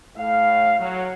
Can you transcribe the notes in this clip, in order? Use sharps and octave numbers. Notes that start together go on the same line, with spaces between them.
A2 F5
F#3